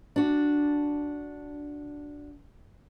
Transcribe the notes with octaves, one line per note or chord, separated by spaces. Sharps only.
D4 F#4